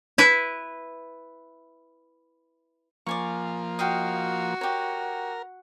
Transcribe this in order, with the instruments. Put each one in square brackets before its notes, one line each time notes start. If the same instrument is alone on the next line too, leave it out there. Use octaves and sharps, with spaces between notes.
[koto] E4 B4 E5
[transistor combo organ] F3 A#3 [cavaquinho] D5 G#5 C#6
[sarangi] F#4 [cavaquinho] D#5 F5 G5
[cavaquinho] G4 C#5 [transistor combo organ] A#4